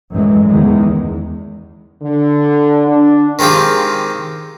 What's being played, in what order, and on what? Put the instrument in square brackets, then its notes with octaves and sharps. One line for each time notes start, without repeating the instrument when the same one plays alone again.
[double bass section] F#2 A2 E3 G#3
E2 D#3 G#3
[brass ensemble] D3
D4
[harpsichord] D#3 G#3 C4 F4 G4